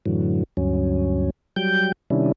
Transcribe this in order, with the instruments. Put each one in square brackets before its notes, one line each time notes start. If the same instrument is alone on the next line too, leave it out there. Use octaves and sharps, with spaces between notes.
[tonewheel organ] F#2 A2 D3 E3 F#3
D2 G2 F#3 C#4
F#3 G3 G5 G6
C3 D#3 G3 C#4 D4 E4